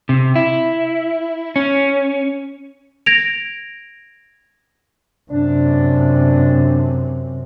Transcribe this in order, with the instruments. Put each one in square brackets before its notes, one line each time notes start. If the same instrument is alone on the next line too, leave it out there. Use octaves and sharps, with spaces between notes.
[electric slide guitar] C3
E4
C#4
[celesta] G#6 A#6 D7 F7
[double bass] F#2 C3 [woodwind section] D4